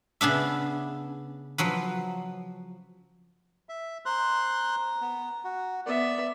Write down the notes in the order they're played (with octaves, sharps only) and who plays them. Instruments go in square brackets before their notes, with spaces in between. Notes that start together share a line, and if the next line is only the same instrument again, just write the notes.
[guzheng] C#3 B3 D4 E5
F3 F#3 B4
[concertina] E5
[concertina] C5 C6 F#6 [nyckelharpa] A#5
[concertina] B3
F#4
[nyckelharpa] B3 E5 [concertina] D5